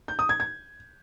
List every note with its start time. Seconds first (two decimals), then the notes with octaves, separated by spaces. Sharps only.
0.08 G6
0.19 D#6
0.29 G#6
0.40 G#6